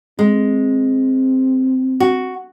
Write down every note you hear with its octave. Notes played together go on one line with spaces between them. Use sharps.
G#3 C4
F#4